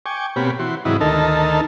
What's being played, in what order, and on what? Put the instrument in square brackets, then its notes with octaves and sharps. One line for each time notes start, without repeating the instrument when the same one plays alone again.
[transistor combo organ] G5 G#5 C#6 D6
B2 A#3 C4 G4 C#5 B5
E3 F#4 C6
G#2 C3 E3 F#3 E4 D#6
D2 D#3 D#4 A4 A#4 A5